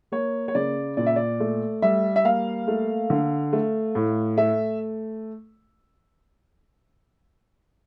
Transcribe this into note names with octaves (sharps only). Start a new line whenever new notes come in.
A#3 C#5
C#5
C#3 D5
A#2 D5
E5
D5
A3
G3 E5
E5
A#3 F5
A3
D3
A3
A2
A3 E5